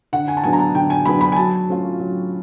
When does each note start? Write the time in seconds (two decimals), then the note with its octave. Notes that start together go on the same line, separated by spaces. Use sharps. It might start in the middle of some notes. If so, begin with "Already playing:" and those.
0.13 D3 F#5
0.28 G#5
0.37 A5
0.43 F#3 B3 D4 G#5
0.53 A#5
0.59 A5
0.75 D3 G5
0.90 G#5
1.05 F#3 B3 D4 B5
1.21 B5
1.32 G#5
1.36 F#3 A5
1.68 A3 C#4 F4
1.99 F#3